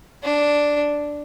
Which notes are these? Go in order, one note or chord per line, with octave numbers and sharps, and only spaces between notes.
D4